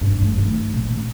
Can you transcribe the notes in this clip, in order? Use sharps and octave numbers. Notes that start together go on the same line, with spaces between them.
G2
A3
D#3
A#2
D#3